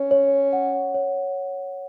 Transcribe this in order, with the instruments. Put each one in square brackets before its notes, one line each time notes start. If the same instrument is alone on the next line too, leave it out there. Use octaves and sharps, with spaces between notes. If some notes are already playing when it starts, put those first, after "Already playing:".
Already playing: [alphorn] C#4 [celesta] C#5
[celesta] C#5
F#5
C#5